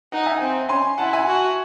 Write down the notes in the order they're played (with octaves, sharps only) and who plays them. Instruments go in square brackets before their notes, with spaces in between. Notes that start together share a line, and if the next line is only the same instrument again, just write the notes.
[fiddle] D#4 [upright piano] D#5 F#5
[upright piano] E5 G#5
[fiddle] C4
[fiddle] C#4 [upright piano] G#5 C6
[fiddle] E4 [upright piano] F#5 A5
[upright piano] E5 G#5
[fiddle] F#4